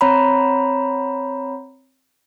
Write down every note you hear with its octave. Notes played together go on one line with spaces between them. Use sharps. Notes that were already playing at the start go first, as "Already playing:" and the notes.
C4 C#5 A#5 B5